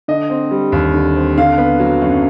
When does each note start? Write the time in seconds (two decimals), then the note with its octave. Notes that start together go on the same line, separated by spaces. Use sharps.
0.08 D3 D#5
0.30 C4
0.51 G3
0.72 D#2
0.94 D3
1.16 C4
1.38 D3 F5
1.58 B3
1.80 F#3
2.02 F#2